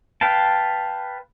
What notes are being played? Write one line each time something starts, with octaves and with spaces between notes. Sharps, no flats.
B4 F5 G5 A5